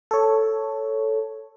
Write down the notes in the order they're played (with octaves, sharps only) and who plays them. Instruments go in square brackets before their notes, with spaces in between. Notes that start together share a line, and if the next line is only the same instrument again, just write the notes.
[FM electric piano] A4 C#5